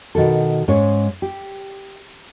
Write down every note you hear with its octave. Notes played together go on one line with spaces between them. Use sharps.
B2 D#3 F#4 A4
G#2 G#3 C#4 C#5
G4